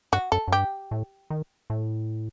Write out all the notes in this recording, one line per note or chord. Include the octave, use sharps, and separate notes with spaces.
G2 F#4
F#2 A4
F#2
G2 G4
A2
D#3
A2